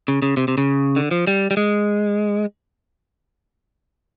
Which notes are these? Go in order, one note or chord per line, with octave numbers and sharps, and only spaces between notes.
C#3
C#3
C3
C3
C#3
D3
F3
G3
G3
G#3